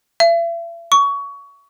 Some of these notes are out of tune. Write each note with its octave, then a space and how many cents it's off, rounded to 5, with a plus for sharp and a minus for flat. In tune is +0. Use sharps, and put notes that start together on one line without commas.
E5 +40
C#6 +25